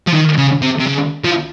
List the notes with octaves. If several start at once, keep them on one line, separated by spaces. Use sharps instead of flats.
F3
D#3
C#3
C3
C3
C#3
F3